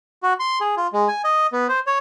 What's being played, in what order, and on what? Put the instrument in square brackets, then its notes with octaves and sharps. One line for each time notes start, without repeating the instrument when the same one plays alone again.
[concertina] F#4
C6
G#4
F4
G#3
G#5
D#5
B3
C5
C#5